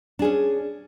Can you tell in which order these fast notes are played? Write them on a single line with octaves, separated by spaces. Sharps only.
D4 G#4 C#4